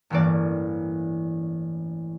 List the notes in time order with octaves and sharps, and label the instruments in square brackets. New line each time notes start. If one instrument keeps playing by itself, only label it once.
[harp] A1 G2 E3 A#3 C#4 D5